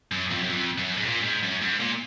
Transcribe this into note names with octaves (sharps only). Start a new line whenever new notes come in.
F#2
F2
F#2
F2
F#2
G#2
A#2
F#2
G#2
F#2
G#2
A#2